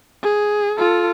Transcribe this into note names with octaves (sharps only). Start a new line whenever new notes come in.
G#4
F4 A4